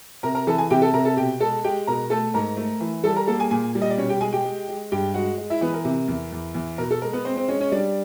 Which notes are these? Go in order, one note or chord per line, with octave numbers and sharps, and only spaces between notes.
C3 A#4 A#5
A#4 A#5
E3 A4 A5
G#4 G#5
C3 G4 G5
A4 A5
C3 A#4 A#5
A4 A5
B2 G4 G5
G#3 A4 A5
G#3 G4 G5
B2 A#4 A#5
A3 A4 A5
G#2 A#4 A#5
A3
E3
G3 A4 A5
A#4 A#5
A#3 A4 A5
G#4 G#5
A#2 G#4 G#5
G3
D#5
D5
B2 C#4 C#5
G4 G5
G#3 G#4 G#5
G4 G5
G#3
G#3
G2 G4 G5
G#3 F#4 F#5
G#3
E4 E5
E3 B3 B4
A#4
C3
E2
E2
E2
B2 A#4
A4
G#3 A#4
B3 B4
G#3 C4 C5
C4 C5
G#3 C#4 C#5
C#4 C#5
G3 D4 D5